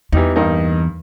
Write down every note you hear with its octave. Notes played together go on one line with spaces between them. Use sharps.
E2 E3 G3 D#4
G2 A#3 D#4